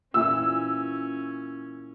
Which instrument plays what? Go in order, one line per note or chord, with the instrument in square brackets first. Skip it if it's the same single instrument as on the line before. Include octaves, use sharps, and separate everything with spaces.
[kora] A#2 E3 [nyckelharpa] C#4 [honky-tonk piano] E6